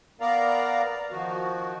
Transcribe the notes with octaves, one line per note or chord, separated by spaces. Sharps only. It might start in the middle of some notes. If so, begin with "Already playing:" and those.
B3 A#4 D5 F5 A#5
D#3 F3 F#4